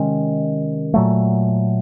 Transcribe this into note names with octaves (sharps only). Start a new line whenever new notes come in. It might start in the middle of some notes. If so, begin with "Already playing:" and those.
Already playing: C3 D#3 G#3 C#4
A#2 F#3 A3